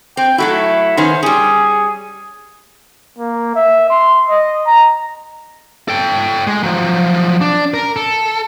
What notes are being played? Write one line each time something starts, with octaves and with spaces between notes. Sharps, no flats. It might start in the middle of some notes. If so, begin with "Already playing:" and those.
C4 G5
F#3 A3 E4 F#4
D#3 B3 C#4 C5
G3 C#4 G#4
A#3
E5
C6
D#5
A#5
A4 G5
G#3
F3 F#3
D4
A#4
A4